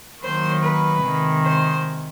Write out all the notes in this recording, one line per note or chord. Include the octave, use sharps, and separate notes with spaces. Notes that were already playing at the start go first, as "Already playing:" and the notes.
D#3 F#3 A#3 C5
B4
C3 D#3 G#3
C5